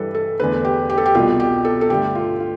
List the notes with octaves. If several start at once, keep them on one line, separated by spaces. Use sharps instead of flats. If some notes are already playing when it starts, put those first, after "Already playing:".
Already playing: G2 E3 G3 A4 B4
A4
E2 D3 A3 B4
G4
G4
A4
G4
C2 B2 G3 F4
G4
A4
A4
G2 D3 A3 G4
F4
F4